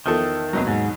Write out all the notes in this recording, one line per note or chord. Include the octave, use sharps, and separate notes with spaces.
E2 D#3 F3 A4
D#2 B2 F#3
G#2